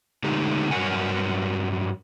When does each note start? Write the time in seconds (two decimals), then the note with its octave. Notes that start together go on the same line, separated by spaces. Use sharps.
0.24 D3 G#3 A3 D#4 G4
0.71 G2 F#3 C4 A#4 F#5 G#5